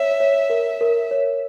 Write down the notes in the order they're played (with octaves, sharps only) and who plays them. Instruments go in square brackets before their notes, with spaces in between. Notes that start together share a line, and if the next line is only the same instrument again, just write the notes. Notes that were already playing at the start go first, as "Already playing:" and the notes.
Already playing: [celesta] C#5 [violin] E5
[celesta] C#5
A#4
A#4
C#5